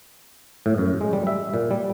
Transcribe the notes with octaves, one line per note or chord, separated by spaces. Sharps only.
A2
F#2
G#3
G3
E5
A#2
G3